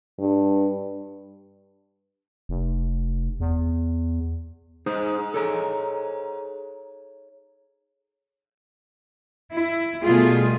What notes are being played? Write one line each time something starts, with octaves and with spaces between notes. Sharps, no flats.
G2
F1
E2
G#2 D#4 G#4 C5
A4 C#5 A#5
E4
B2 G3 A3 B3 F4 G#4